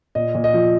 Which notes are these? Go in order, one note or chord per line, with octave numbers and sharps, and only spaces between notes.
A#2 D#5
A#2
D#5
F3